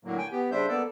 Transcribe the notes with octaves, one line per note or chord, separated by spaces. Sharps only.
A2 D3 F#3 A#3
G5 G#5
B3 G4
C#3 G3 D4 C5 E5 G6
A#3 B3 A4 D5 E6